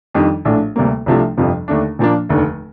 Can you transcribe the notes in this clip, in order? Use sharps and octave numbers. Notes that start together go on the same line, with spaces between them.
F2 D#3 G3 D4
A#1 A2 A3 D4
D2 C3 G3 A#3
C2 C3 F3 A3 D4
G1 F2 C3 F3
D#2 D3 A3 D4
A#2 F3 A#3 D4
F1 D#2 D3